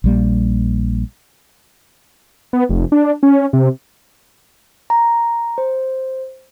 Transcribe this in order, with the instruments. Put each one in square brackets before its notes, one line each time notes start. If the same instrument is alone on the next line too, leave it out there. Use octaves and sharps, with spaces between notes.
[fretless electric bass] A#1 G3 A#3
[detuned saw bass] B3
F1
D4
C#4
C3
[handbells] A#5
C5